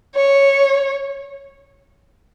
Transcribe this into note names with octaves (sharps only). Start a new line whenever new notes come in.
C#5